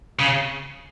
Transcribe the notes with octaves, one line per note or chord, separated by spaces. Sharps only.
C#3